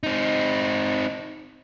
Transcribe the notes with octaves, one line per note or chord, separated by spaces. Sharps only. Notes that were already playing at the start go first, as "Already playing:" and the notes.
C4 D#4